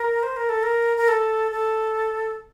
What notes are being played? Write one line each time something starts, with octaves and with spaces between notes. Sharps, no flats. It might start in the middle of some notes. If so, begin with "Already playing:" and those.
Already playing: A#4
C5
A#4
A4
A#4
A#4
A4
A4